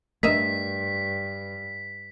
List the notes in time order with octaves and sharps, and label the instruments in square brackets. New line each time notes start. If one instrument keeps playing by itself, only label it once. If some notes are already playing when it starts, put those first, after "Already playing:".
[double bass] G2 [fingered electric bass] A3 B3 D4 [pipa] A#4 D#5 E5 [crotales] B6